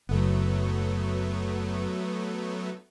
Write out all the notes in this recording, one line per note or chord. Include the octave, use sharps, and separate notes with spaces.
F#1 F#3 A3 B3